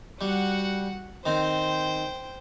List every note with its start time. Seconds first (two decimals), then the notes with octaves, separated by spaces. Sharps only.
0.21 G3 F#4 F#5
1.26 D#3 C4 C5 G5